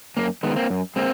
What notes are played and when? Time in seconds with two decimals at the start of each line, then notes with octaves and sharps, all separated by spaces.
0.17 F#2 A#3
0.43 D#3 G#3 B3
0.56 A#3 C4
0.70 F#2
0.96 G#3 A#3 C4